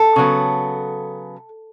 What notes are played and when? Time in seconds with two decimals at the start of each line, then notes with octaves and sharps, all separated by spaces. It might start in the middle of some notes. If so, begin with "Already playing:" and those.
Already playing: A4
0.16 C#3 F#3 B3